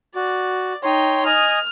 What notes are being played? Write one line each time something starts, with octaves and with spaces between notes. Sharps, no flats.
F#4 D5
D#4 C#5 G5 C6
D#5 G#5 D#6 F6